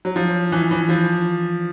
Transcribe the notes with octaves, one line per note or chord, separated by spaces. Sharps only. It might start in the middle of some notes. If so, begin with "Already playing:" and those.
F#3
F3
E3
E3
F3